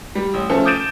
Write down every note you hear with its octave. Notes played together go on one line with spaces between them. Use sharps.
G3
A1
F3 A3 C#4 A4
D6 D#6 G6 A6 D7 E7